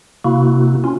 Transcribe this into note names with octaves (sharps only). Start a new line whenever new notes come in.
C3 A#3 E4 F#4
C#4 F4